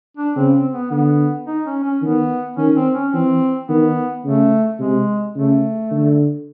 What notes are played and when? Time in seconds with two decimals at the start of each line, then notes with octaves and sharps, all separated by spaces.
0.17 D4
0.36 C#3 C4
0.54 C4
0.73 B3
0.91 D3 B3
1.47 D#4
1.66 C#4
1.84 C#4
2.02 D#3 B3
2.57 D#3 C#4
2.76 C4
2.94 C#4
3.13 E3 C4
3.68 D#3 B3
4.24 C#3 A3
4.79 C3 G#3
5.35 C#3 A3
5.91 D3